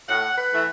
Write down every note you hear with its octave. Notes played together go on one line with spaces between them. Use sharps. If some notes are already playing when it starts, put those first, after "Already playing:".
A2 F#5
B4
E3 A3 E4